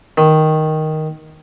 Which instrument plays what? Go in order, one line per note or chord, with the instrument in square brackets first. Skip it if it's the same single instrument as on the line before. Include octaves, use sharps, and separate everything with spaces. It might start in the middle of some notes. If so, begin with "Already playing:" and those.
[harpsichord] D#3